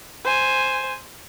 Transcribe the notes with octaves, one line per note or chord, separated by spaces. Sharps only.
C5 G#5